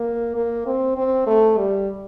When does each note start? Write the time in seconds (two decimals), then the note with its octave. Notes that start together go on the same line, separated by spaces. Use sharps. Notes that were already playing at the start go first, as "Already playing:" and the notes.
Already playing: A#3
0.36 A#3
0.66 C4
0.97 C4
1.27 A3
1.57 G3